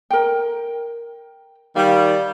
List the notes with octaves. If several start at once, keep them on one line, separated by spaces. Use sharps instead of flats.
A#4 G5
D#3 G3 F5